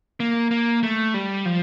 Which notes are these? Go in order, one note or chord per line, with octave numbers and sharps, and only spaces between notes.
A#3
A#3
A3
G3
F3